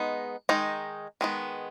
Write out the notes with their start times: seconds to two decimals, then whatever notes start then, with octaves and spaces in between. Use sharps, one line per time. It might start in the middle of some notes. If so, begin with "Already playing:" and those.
Already playing: G#3 B3 D#4
0.49 D#3 G#3 D#4
1.21 D#3 G#3 B3